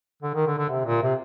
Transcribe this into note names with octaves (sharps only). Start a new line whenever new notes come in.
D3
D#3
D3
D3
C3
A#2
C3